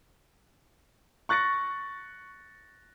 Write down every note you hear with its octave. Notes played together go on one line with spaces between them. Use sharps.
C#6 F#6 A6 A#6 C#7